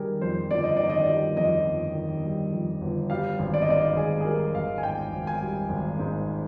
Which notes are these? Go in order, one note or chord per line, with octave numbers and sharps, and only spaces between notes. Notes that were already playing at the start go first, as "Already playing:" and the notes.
Already playing: D#3 G3 G#4 A#4
F2 C5
G1 D5
D#5
D#3 D5
D#5
G3 D5
F2 D#5
G1
D#3
G3
F2
G1
G3 F5
G#1
D5
D#5
G#2 D5
G#1 G#4
G#4
G3 A#4
G#1 F5
G#5
G#2 G5
G#1
G#5
G3
G#1
G#2